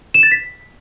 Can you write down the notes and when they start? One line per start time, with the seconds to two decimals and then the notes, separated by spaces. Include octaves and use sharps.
0.14 E7
0.23 A6
0.32 B6